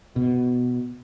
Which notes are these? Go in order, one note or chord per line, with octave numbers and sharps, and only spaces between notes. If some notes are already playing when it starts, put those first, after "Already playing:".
B2